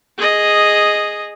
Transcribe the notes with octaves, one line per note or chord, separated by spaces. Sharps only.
G#4 D#5